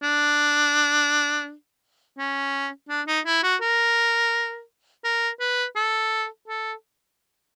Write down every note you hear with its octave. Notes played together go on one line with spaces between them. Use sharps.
D4
C#4
D4
D#4
E4
F#4
A#4
A#4
B4
A4
A4